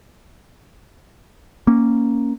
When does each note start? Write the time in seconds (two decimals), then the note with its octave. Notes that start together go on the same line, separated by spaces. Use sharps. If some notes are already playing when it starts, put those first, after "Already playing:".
1.67 A#3 C#4